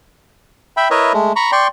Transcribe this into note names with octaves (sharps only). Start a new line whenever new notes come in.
E5 G5 B5
E4 A#4 B4 C#5 D#5 E5
G#3 A3
A#5 B5 C#6
D5 G5 C6 C#6